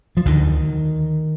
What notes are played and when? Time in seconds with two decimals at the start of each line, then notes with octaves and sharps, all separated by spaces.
0.17 F3
0.26 D2 D3 D#3